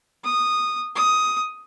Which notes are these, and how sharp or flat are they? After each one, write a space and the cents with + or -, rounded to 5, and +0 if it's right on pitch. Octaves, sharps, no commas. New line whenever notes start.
D#6 -10
D#6 +10